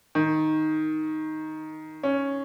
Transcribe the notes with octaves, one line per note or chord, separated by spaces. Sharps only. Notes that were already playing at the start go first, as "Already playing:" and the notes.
D#3
C#4